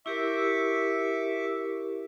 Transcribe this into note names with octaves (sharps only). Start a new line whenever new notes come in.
E4 G4 A#4 E5 C#6 D6